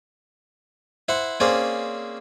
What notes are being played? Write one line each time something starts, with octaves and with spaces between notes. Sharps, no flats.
E4 C5 F#5
A#3 C4 C#4 G#4 C5 D5